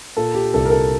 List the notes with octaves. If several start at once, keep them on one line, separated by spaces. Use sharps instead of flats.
A#2 A4
G4
C2 A4
A#4
A4